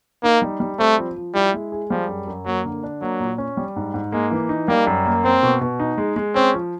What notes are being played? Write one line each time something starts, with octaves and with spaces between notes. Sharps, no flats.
A#3 D#4
G3
G3
A3 C4
F3
F3
G3 E4
G#3
G#4
F3 G3
F#2
F#2
F#3 A#3
D3
D4
F#3 A#3
A#2
C#4
G3
G#2
G#2
G#3 A#3
E3
D#4
G3 A#3
F#2
A#3
A#3 C4
B2
B2
D#4
G#3
G#3
C4 C#4
F3